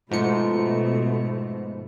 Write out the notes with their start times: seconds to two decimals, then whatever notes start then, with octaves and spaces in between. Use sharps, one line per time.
0.11 G#2 B2 F3 A3 C#7